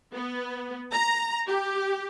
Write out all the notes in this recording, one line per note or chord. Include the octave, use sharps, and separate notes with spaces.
B3
A#5
G4